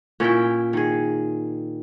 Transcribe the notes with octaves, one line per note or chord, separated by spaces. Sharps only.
A#2 C#4 E4 G5
D#3 G#4